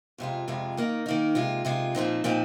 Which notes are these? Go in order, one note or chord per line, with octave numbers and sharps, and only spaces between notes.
F2 C3 G#3 F4
F2 C3 G#3 F4
D#3 A#3 D#4
D#3 A#3 D#4
C3 G#3 F4
C3 G#3 F4
A#2 F3 C4 D#4
A#2 F3 C4 D#4